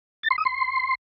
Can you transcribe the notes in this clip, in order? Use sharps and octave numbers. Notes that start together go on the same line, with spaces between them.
A6
C6
D#6
C6